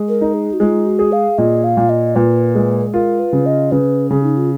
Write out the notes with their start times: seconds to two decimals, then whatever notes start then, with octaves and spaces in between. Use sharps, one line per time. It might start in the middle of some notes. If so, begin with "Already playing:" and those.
Already playing: G#3
0.09 A#4
0.21 D#4
0.34 G#4
0.53 F#4
0.60 G#3 F4
0.85 F#4
0.99 G#4
1.12 F5
1.38 A#2 D#5
1.64 F5
1.77 A#2
1.89 D#5
2.15 A#2 B4
2.55 G#3
2.93 F4 A#4
3.19 B4
3.33 C#3
3.46 D#5
3.72 C#3 B4
4.10 C#3 G#4
4.24 D#4
4.37 F4